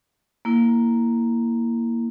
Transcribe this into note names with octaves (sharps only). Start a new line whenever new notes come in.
A#3 E4